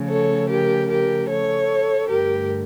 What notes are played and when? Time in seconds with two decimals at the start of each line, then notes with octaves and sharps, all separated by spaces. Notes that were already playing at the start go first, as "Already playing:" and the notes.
Already playing: C#3 F3 A3
0.08 A4 C#5
0.49 G4 A#4
0.89 G4 A#4
1.29 A4 C#5
2.09 G2 D3 A3 G4 A#4